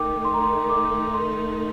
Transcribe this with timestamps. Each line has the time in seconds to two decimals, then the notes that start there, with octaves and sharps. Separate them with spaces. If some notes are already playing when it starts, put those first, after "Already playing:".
Already playing: D#3 A3 D#4 G5 D6
0.25 C6
0.34 A#5
0.43 C6
0.69 D6
1.14 C6